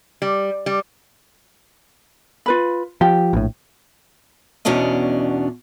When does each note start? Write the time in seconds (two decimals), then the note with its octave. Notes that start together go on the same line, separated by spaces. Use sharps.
0.22 G3
0.66 G3
2.46 F4 B4 B5
3.01 F3 G4
3.33 A#1 A2
4.65 E2 B2 C#4 D4 D#5